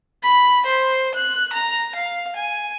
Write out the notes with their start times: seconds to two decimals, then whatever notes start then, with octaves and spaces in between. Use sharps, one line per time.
0.23 B5
0.66 C5
1.15 F#6
1.53 A#5
1.95 F5
2.36 G#5